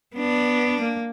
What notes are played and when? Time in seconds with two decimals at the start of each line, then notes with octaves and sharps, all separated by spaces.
0.15 B3 D4
0.81 A#3